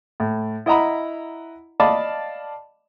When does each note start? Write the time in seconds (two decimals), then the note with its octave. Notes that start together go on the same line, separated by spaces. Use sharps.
0.20 A2
0.66 E4 D#5 F#5 A#5 B5
1.80 D5 D#5 F5 A5 B5 D6